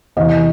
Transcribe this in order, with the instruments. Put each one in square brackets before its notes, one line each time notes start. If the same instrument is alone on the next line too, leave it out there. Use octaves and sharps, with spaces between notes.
[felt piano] E2 C3 E3 D#5